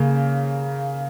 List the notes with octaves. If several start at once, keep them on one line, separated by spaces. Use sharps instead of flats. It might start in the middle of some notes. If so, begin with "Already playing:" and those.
Already playing: C#3 A#3